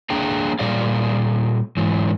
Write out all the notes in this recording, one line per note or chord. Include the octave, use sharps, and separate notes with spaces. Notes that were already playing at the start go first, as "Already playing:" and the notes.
A#3 D4 G#4 F5 G5 A#5
A#2 G3 G#4 D5 F5
G#2 E3 F#3